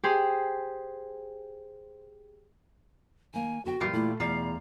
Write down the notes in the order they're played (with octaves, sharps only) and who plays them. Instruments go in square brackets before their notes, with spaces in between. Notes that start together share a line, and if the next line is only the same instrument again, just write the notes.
[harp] G4 G#4 C5
[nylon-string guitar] D#3 A#3 [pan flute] G#5
[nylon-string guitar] D3 B3 G5 [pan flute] F#4
[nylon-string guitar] A#2 G3 [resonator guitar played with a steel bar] E3 F4 G4
[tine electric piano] A#2 [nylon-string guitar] A3 [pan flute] E4
[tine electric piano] E2 [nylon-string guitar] B2 [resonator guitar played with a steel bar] G3 F4 [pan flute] A#5